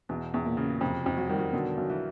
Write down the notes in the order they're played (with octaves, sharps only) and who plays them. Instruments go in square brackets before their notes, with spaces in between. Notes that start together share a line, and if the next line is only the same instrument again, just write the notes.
[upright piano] E2 [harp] B2
[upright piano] E2
[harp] A#2
[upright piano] C#3
[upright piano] F2 [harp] C3
[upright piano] F2
[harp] F#3
[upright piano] D#3 [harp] G3
[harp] F#3
[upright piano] B2 [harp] D3
[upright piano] B1
[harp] E3